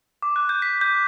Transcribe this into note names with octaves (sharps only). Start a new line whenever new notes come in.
D6
F#6
G6
B6
G6